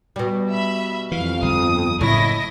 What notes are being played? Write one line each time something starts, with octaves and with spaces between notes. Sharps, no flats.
B2 G3
E5 B5
F2 E3 F5
G1 D#6
F#1 A2 E4 D#5 A#6